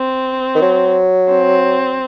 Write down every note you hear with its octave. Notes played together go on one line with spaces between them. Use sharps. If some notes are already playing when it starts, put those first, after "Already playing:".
Already playing: C4
D#3
F#3
C4